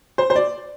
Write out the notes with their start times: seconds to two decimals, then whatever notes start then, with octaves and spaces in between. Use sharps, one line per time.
0.18 C5
0.30 C5
0.36 D5